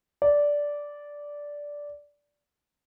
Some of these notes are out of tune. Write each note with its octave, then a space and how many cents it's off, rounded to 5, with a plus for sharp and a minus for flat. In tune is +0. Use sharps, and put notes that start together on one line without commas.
D5 -10